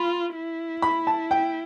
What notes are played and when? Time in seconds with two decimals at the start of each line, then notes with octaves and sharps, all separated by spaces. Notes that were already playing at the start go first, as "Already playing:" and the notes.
Already playing: F4 B5
0.35 E4
0.82 B5
1.07 A5
1.31 G5